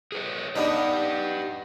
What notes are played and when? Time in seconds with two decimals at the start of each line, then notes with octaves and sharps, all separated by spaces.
0.12 G#4 B4 C#5
0.56 B3 D4 D#4 G4 B4